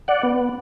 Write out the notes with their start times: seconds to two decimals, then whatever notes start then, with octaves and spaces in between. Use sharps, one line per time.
0.08 D5 F#5
0.23 B3